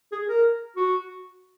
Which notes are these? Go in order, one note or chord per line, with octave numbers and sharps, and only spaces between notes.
G#4
A#4
F#4